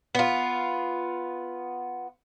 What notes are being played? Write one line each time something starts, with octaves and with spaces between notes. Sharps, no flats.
B3 F4